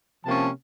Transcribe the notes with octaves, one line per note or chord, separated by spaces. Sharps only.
C3 F3 A#3 C#4 A5